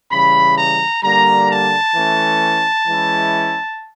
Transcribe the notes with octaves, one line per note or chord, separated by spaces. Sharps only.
C#3 E3 G3 B5
A#5
D3 G3 A#3 A#5
A5
E3 A3 C#4
E3 G#3 C#4 E4